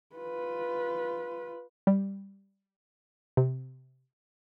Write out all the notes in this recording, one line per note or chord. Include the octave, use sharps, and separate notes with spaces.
F4 B4
G3
C3